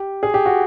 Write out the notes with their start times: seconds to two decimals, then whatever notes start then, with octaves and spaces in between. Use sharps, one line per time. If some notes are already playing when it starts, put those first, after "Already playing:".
Already playing: G4
0.23 G#4
0.34 G4
0.46 F#4